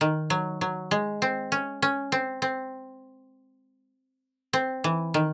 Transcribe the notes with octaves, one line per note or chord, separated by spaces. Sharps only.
D#3
F#3
F#3
G#3
C4
C#4
C#4
C4
C4
C4
E3
D#3